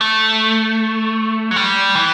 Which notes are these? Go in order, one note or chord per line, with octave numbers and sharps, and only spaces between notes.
A3
F#3
G3
E3